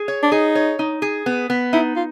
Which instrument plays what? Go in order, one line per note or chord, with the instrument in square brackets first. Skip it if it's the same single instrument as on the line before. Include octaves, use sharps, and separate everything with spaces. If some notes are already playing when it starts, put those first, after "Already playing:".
Already playing: [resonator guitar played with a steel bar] G#4
C#5
[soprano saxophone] D4
[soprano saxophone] D#4 [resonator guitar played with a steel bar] G#4
[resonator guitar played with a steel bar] C#5
D#4
G#4
B3
B3
[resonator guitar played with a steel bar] D#4 [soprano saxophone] E4
[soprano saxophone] F4